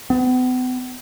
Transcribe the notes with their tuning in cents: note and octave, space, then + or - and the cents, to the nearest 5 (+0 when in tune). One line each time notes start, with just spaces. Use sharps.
B3 +40